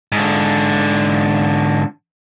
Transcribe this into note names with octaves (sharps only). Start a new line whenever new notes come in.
G#2 D3